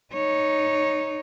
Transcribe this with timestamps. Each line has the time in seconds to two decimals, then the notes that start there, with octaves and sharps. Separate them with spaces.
0.14 D#4 C#5